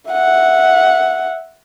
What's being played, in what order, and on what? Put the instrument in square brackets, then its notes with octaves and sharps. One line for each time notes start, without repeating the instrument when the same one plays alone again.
[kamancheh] E5 F#5